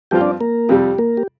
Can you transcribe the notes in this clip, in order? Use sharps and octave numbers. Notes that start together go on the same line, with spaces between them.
G2 F3 C4 F4 G4 G5
D4 D5
A#3 A#4
F2 C3 G3 G4
A#3 A#4
G4